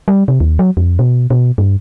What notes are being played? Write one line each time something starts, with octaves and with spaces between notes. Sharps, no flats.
G3
C3
D#2
F#3
F2
B2
B2
G2